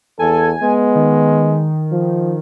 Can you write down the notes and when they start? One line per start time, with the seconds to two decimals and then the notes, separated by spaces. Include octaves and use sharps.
0.19 E2 A4 G#5
0.63 G#3 B3
0.95 D#3
1.92 F3